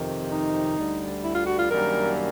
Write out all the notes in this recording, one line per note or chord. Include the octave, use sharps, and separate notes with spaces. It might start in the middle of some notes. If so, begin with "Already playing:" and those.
Already playing: F2 C3 D#3
D#4
D2 D3 G3
E4
F4
F#4
F4
F#2 D#3 G3 A#3 D4 A#4